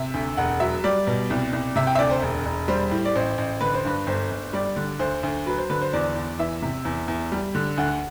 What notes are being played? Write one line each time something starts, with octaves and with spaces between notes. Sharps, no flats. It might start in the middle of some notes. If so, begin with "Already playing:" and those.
Already playing: C3 E5
D2
E1 F#5
F#3 E5
G3 D5
B2
C2
C2
C3 E5
G5
E5
D2 D5
C5
E1
E1
G3 C5
A2
D5
A1 C5
A1
D3 B4
C5
G2 B4
G1 C5
G1
G3 D5
D3
D2 C5
D2
F#3 B4
C5
D3 B4
C5
E2 D5
E2
E3 E5
C3
E2
E2
G3
D3
D2 F#5